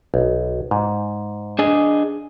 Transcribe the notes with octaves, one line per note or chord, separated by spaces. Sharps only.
B1
G#2
D4 G#4 D#5